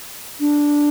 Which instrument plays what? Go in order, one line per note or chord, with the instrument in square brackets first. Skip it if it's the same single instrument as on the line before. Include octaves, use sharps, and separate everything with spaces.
[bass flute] D4